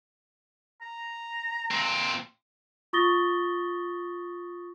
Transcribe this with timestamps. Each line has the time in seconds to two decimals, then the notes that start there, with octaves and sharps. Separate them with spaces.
0.82 A#5
1.71 A#2 C4
2.93 F4 C#6 D#6 A6 A#6 G7